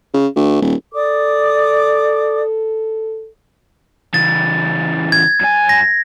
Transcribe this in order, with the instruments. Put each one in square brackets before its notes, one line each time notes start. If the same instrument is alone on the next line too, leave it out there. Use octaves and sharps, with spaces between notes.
[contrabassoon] C#3
D2
D#1
[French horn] A4 [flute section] D5 D6 D#6
[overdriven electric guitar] C#3 E3 [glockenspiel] A6
[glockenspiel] G#6
[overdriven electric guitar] F#2 G#5
[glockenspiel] A#6